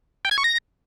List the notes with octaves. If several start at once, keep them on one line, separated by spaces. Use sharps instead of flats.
G5
G#6
C#6
A#6